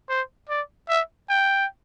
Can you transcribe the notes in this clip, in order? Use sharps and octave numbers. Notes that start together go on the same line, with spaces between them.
C5
D5
E5
G5